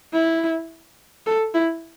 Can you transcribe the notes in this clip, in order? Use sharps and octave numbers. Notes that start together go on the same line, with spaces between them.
E4
A4
E4